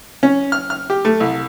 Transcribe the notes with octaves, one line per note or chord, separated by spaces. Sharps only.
C#4
F6
F6
G4
A3
C2